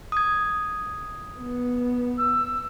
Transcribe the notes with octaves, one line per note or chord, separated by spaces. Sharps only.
D#6 G#6
B3
E6